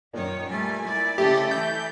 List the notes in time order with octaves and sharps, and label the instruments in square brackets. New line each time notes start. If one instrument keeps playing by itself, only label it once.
[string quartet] F#2 D#3 C#5 [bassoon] A#2
[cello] G3 A3 [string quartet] G#5
[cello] E4 D5
[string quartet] C#3 A4 D#5 [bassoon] A3 [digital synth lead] G4
[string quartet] E3 [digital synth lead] G6